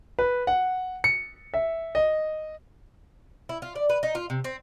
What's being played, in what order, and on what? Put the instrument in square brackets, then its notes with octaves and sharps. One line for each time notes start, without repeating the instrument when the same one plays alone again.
[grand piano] B4
F#5
C#7
E5
D#5
[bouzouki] E4
F4
D5
B4
D#4
F4
C3
C4